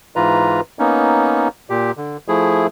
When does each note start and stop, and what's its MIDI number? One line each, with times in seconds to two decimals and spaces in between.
0.16 0.61 44
0.16 0.61 52
0.16 0.61 65
0.16 0.61 71
0.16 0.61 82
0.79 1.48 58
0.79 1.48 59
0.79 1.48 61
0.79 1.48 63
1.70 1.91 46
1.70 1.91 67
1.97 2.17 50
2.28 2.67 53
2.28 2.67 57
2.28 2.67 64
2.28 2.67 68